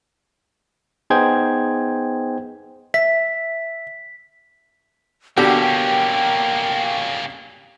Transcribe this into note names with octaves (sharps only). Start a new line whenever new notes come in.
B3 D#4 G#4 C5 G5 G#6
E5 B6
B2 D3 A#3 C#4 G4 G5